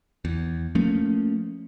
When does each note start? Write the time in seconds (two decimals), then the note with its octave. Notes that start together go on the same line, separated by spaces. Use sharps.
0.25 E2
0.75 F3 A3 A#3 C#4